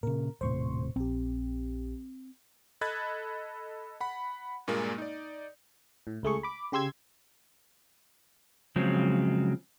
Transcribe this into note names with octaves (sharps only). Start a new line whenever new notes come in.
A#2 C#3 A#4
D#1 A2 C3 C5 C6 C#6
A#1 C4 G4
A4 D#5 B5 F#6 G#6 A6
F#5 B5
G2 A#2 G#3 A#3
D#4 D5
A2
C#2 A3 G#4 C#6
B5 D6
C#3 G4 C6 E6 G#6
C#3 F3 F#3 G#3 C4